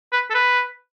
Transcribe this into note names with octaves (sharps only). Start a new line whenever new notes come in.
B4
A4
B4